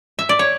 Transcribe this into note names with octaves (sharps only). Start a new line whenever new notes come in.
E5
D5
C#5